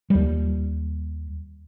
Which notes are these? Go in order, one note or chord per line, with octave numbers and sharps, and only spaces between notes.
D#2 G3